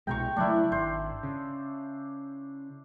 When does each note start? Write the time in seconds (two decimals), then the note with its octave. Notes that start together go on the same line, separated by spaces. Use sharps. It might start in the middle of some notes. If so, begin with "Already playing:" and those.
0.07 C2 B2 G#3 G5 A#5 C#6
0.36 C#3 F#3 A3 D4 E4
0.72 G#1 C5
1.23 C#3